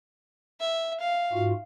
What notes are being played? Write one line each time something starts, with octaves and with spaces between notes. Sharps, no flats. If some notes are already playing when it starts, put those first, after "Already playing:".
E5
F5
G#2 F4 F#4